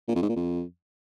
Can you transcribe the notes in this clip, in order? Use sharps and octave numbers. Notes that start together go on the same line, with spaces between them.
A#2
F2
G#2
A#2
F2